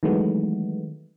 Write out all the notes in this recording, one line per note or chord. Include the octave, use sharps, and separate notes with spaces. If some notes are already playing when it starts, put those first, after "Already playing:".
D#3 E3 F#3 G#3 A3 B3